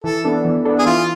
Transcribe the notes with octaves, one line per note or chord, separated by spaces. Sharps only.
E3 A4
B3 D4 A4
E3
B3 D4 A4
G#4
E3 F4